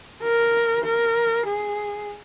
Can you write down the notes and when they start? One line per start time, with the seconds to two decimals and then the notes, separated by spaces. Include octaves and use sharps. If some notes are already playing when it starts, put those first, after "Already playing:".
0.23 A#4
0.85 A#4
1.47 G#4